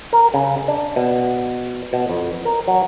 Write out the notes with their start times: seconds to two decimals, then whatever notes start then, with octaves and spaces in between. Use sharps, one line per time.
0.13 A#4
0.34 C#3
0.68 D4
0.96 B2
1.93 B2
2.10 F2
2.45 A#4
2.68 F#3